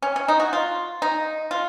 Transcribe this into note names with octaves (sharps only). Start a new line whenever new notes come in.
C#4
C#4
D#4
F#4
F4
D#4
F4